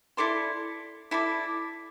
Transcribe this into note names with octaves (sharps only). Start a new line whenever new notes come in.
E4 A4 D5 C6
E4 A4 D5